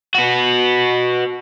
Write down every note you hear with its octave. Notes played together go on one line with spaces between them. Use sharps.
B3 F#4